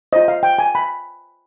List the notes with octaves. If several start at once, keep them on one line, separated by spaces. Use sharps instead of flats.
F4 C5 D#5
F5
G5
G#5
B5